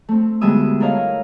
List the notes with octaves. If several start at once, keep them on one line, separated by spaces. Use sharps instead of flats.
A3 C4
D2 G3 G#3 B3 E5 D#6
E4 A4 A#4 C#5 D#5 F5